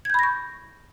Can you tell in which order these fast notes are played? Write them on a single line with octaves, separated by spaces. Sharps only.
G#6 G6 B5 A#6 C#6